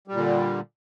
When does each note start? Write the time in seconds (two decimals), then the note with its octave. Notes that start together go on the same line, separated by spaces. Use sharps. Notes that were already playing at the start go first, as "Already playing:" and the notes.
0.07 G3
0.12 A#2
0.17 D3